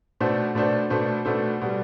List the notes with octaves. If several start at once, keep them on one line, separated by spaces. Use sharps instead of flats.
B2 A3 D4 A4 C5
B2 A3 D4 A4 C5
B2 A3 D4 A4 C5
B2 A3 D4 A4 C5
B2 G3